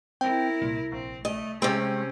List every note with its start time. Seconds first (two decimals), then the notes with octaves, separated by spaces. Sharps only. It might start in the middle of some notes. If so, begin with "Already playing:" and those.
0.21 C4 E4 A#4 G5
0.62 C2 A#2
0.92 A#1 C4
1.25 A3 D#5
1.62 C3 G#3 C4 C#4